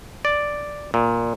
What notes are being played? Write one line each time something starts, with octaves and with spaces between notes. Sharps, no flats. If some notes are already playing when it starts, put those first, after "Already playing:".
D5
A#2